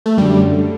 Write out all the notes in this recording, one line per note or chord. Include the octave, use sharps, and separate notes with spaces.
A3
F#2 D3 G3
D3